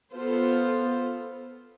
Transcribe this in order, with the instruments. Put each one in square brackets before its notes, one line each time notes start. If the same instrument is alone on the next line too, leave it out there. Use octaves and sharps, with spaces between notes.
[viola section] B3 F4 A4 C5